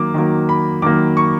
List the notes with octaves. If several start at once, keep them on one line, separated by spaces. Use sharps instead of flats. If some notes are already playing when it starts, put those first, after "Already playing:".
Already playing: D#3 F#3 A#3 D6
D#3 F#3 A#3
B5
D#3 F#3 A#3 D6
C#6